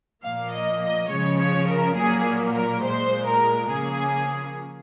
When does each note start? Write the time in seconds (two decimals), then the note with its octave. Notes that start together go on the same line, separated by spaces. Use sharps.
0.24 A#2 F3 A#3 F5
0.53 D#5
0.82 D#5
1.10 C#3 F3 G#3 C#5
1.39 C#5
1.68 A#4
1.97 A#2 F#3 A#3 G#4
2.55 A#4
2.84 A#2 G#3 C5
3.27 A#4
3.71 C#3 F3 A#3 G#4